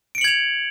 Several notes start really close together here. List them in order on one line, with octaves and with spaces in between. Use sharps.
D7 C#7 F#7 G#6 F7